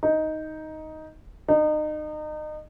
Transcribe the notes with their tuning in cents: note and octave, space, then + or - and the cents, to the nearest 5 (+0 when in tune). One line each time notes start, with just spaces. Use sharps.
D#4 +5
D#4 -30